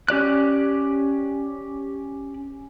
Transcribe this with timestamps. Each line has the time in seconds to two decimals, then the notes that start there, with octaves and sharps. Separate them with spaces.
0.09 C#4 G4 D5 F#6